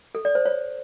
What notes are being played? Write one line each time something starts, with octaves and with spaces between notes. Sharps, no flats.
A4
D5
C5
C#5